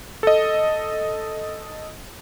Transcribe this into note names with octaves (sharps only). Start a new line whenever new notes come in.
A4 D#5